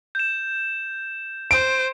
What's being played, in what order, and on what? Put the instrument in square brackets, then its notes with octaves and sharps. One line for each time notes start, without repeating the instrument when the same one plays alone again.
[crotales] G6 E7
[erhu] C5 [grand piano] D7